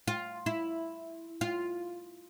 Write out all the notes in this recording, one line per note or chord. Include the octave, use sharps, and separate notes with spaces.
F4
E4
F4